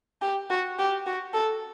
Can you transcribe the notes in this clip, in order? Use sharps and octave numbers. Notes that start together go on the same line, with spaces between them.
G4
F#4
G4
F#4
A4